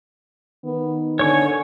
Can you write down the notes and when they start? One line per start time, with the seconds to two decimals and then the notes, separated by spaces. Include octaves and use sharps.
0.65 D#3 B3
1.19 D3 C#5 G#5 C#6